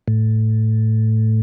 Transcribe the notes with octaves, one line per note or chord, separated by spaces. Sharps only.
A2